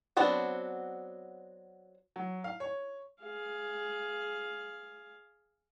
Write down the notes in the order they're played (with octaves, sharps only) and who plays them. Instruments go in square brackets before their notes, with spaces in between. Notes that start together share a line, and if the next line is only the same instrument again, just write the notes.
[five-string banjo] F#3 B3 C4 D4 F#4
[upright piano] F#3
F5
C#5
[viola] G#4 F5